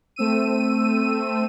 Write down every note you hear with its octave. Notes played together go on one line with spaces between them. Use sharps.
A3 C4 E6 D#7